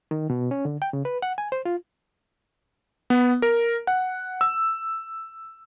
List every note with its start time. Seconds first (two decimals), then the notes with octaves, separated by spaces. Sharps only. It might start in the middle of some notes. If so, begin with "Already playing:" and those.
0.11 D#3
0.30 B2
0.51 C#4
0.65 D3
0.82 G5
0.93 C#3
1.05 B4
1.22 F#5
1.38 G#5
1.52 C5
1.65 F4
3.10 B3
3.42 A#4
3.87 F#5
4.41 E6